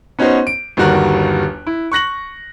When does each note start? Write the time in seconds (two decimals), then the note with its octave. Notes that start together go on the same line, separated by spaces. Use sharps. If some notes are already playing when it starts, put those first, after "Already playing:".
0.19 B3 C#4 D#4 F#4 C5
0.47 D7
0.77 G1 D#2 G3 F#4 A#4 F#6
1.67 E4
1.92 C#6 F#6 A#6 F#7